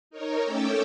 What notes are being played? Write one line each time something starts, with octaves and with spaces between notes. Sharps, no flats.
D#4 A#4 C#5
A3 C#4 A4 G5 D6 E6